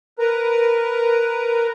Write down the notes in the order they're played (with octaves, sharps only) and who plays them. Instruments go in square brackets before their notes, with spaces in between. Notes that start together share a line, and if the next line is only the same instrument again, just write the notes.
[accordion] A#4 B4 A#5